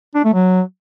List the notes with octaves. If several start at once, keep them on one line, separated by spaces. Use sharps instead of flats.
D4
A3
F#3